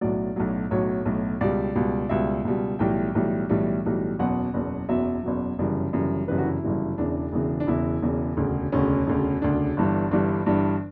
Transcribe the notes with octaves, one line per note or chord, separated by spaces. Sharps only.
B1 A2 F#3 D5
B1 A2 F#3
B1 A2 F#3 C#5
B1 A2 F#3
C#2 B2 G3 D5
C#2 B2 G3
C#2 B2 G3 E5
C#2 B2 G3
B1 A2 E3 G3 G5
B1 A2 E3 G3
B1 A2 E3 G3
B1 A2 E3 G3
F#1 E2 B2 F#3 F#5
F#1 E2 B2 F#3
F#1 E2 B2 F#3 E5
F#1 E2 B2 F#3
G1 F#2 C#3 E3 G3 D5
G1 F#2 C#3 E3 G3
G1 F#2 C#3 E3 G3 B4
F#4
E4
G1 F#2 C#3 E3 G3
E1 E2 C#3 E3 D4
E1 E2 C#3 E3
D4
E1 E2 C#3 E3 E4
E1 E2 C#3 E3
E1 D2 C#3
E1 D2 C#3 C#4
E1 D2 C#3
E1 D2 C#3 D4
G1 G2 E3 G3
G1 G2 E3 G3 D4
G1 G2 E3 G3